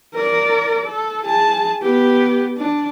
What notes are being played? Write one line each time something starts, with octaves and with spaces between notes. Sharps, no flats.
A#4 D5
A4
G#4 A5
B3 G4
D4